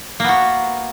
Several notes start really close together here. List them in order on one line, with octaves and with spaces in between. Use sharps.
A#3 B3 F#4